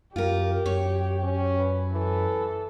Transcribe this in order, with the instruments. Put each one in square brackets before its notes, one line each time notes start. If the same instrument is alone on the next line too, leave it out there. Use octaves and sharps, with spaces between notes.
[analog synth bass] F#2 [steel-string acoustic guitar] F4 A#4 [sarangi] G4
[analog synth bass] F#2 [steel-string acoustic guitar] C#5
[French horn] C#4
[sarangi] B4
[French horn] E3 [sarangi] A4